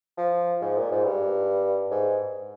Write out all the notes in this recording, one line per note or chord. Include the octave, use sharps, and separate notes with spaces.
F3
G#2
A#2
G#2
G2
G#2